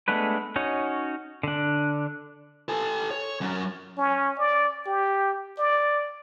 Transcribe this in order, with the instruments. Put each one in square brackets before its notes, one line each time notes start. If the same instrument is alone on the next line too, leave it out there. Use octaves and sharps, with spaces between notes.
[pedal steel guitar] G#3 A3 B3 D4 B4
C#4 D#4 F#4 C#5
D3 D4
[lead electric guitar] A4 G#5
C#5
F#3 C#4
[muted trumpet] C#4
D5
G4
D5